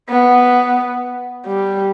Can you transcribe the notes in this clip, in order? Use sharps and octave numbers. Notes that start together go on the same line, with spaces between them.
B3
G3